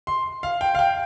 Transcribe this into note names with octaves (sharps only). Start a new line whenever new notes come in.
C6
F5
G5
F5
G5